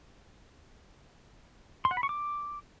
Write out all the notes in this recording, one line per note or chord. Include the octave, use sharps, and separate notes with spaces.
C6
F#5
B5
C#6
D6